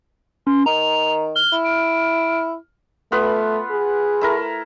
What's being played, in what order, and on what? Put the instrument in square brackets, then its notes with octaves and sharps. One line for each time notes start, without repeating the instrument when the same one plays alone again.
[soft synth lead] C#4 [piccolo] C6
[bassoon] D#3 [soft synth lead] A#5 [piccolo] F7
[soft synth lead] F6 [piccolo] G7
[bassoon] E4
[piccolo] D7
[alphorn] A3 [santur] B3 F4 B4
[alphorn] G#4
[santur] A3 E4 A#4